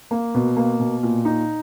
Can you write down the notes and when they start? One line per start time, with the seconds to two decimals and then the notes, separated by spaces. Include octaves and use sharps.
0.11 A#3
0.35 B2
0.57 A#3
0.80 B2
1.03 A#2
1.25 D#4